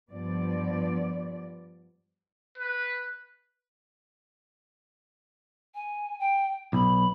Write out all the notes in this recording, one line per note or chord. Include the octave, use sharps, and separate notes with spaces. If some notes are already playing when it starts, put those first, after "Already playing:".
G2 F3 B3 D5
B4
G#5
G5
B1 B5